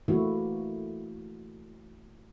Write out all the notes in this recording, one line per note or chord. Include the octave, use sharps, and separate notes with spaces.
E3 A3 A#3 E4 F#4